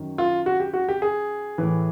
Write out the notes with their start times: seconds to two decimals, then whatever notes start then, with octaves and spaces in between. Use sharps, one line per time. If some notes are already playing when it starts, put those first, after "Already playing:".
Already playing: F#2 D#3
0.18 F4
0.46 F#4
0.60 G4
0.74 F#4
0.89 G4
1.02 G#4
1.58 A2 E3